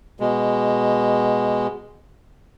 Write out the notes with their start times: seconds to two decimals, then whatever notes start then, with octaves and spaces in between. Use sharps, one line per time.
0.20 B2 G#3